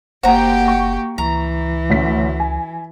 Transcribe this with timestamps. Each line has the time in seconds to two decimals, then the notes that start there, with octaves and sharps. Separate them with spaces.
0.23 F#1 A#3 F#4 G4 C5 F#5 G5 A#5
0.68 C#6
1.18 C#2 E3 A#5
1.90 D2 C#4 B6
2.40 G#5